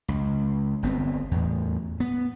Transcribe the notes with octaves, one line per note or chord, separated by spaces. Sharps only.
C#2
G1 B3 C4
E2 A2
B3